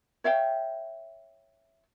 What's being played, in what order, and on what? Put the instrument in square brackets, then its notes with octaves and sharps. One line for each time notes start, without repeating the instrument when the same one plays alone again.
[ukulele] C#5 E5 F5 G5